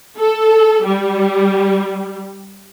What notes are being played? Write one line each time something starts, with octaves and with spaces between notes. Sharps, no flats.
A4
G3